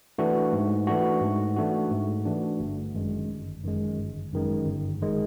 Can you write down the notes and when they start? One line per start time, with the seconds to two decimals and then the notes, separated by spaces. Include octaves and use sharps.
0.18 E3 A3 D4 F#4
0.53 G#2
0.87 E3 A3 D4 F#4
1.21 G#2
1.56 E3 A3 D4 F#4
1.91 G#2
2.26 E3 A3 D4 F#4
2.60 G1
2.95 F#2 D#3 G#3
3.29 G1
3.63 F#2 D#3 G#3
3.98 G1
4.33 F#2 D#3 G#3
4.67 G1
5.02 D#3 G#3